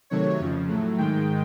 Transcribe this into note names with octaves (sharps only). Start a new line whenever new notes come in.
C3 D#3 F#3 A3 C#5
F2 C#3 F3
A2 F#3 A3
G#2 D#3 G#3 G5